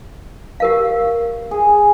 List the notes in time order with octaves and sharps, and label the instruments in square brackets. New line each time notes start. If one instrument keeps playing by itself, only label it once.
[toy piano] G4 A#4 F5
[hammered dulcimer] G#4